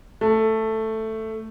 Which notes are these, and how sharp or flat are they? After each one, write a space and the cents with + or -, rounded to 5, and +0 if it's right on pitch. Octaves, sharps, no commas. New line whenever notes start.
A3 +5